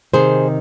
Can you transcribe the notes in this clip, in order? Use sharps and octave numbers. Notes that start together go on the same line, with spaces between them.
C3 D#3 G#4 C5